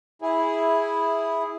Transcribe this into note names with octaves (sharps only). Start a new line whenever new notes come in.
E4 G#4